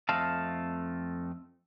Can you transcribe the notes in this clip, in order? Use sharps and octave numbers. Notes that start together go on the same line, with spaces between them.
F2 A3 C4 D#5 F5 A5